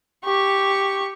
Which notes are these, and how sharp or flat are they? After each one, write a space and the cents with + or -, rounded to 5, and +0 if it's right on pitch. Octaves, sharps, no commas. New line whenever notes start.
G4 +0 C#6 +0